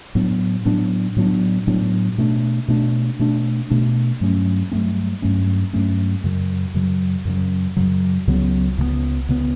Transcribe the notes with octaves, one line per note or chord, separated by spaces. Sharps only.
A2 F#3 B3 D4
A2 F#3 B3 D4
A2 F#3 B3 D4
A2 F#3 B3 D4
B2 A3 D4
B2 A3 D4
B2 A3 D4
B2 A3 D4
G2 F#3 A3 C#4
G2 F#3 A3 C#4
G2 F#3 A3 C#4
G2 F#3 A3 C#4
F#2 C#3 F#3
F#2 C#3 F#3
F#2 C#3 F#3
F#2 C#3 F#3
C#2 C#3 F#3 B3
C#2 C#3 F#3 B3
C#2 C#3 F#3 B3